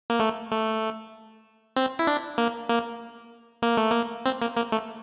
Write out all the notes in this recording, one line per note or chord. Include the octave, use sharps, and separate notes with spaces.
A#3
A3
A3
C4
E4
D4
A#3
A#3
A#3
A3
A#3
C4
A#3
A#3
A3